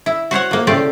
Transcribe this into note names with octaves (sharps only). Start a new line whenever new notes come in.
E4
F#4 C5 C#5 F#5
F3 A#3
A2 C#3 A3 F4 G4 D5